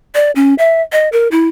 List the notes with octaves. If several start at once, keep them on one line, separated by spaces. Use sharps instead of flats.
D5
C#4
E5
D#5
A#4
E4